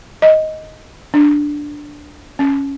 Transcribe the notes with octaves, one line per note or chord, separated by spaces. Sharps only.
D#5
D4
C#4